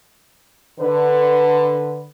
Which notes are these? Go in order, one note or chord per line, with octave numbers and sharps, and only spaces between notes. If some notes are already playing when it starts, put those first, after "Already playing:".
D3 B4